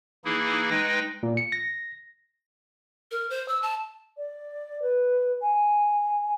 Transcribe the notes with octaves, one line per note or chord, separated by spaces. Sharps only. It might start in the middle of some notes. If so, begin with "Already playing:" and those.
E3 A#3 D#4 E4 G#4
G#3 D#4 B4 G5 A#6
A#2
C#7
A#6
A#4
C5
E6
A5
D5
B4
G#5